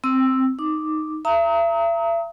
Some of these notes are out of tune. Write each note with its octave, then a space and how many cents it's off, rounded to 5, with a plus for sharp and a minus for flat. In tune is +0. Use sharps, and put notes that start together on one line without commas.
C4 +0 E6 +0
D#4 +0 D6 +0
E5 +40 A#5 -15 D#6 +40